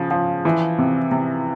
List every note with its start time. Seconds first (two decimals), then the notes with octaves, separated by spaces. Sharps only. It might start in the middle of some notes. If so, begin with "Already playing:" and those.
Already playing: C#3 F3
0.11 F3
0.45 E3
0.78 C3
1.11 C3